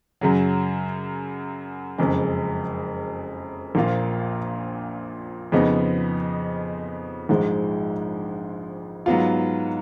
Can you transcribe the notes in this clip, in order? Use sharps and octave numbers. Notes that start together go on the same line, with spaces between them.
F#2 C#3 F#3
F#1 F2 C#3 G#3
A#1 A#2 F3 A#3 F4
F2 C#3 F3 B3 D#4
A#1 G#2 F3 G#3
G#2 F#3 B3 F4